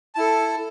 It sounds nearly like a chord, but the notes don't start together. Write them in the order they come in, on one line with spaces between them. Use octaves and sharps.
A5 E4 A4